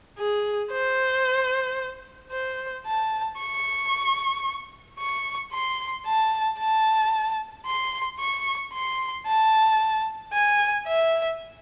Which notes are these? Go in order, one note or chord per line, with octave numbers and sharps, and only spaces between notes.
G#4
C5
C5
A5
C#6
C#6
C6
A5
A5
C6
C#6
C6
A5
G#5
E5